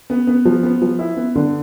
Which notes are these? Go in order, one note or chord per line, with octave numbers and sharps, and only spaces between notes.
B3
B3
F3
B3
F3
E4
B3
D3